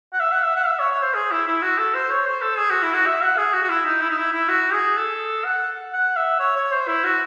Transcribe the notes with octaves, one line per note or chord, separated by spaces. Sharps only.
F#5
E5
F#5
E5
F#5
E5
C#5
C#5
C5
G#4
E4
E4
F#4
A4
C5
C#5
C5
A4
G#4
F#4
E4
F#4
E5
F#5
G#4
F#4
F#4
E4
D#4
E4
D#4
E4
E4
F#4
G#4
A4
F#5
F#5
E5
C#5
C#5
C5
E4
F#4